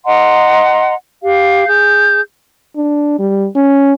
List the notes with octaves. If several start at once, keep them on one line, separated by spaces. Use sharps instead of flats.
D#5 F#5 A#5 C6
G4 F5
G#4 G6
D4
G3
C#4